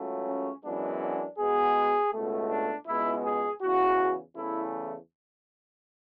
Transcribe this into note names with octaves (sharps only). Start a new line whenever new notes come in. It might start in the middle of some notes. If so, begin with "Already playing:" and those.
Already playing: C#2 C#3 F#3 A3
C#4
F#2 E3 G#3 B3 D4
D4
B2 G#3 B3 G#4
C#2 B2 A3
D4
C#2 B2 G#3 B3 E4
G#4
E2 C#3 E3 F#4
E2 C#3 E3 A3 E4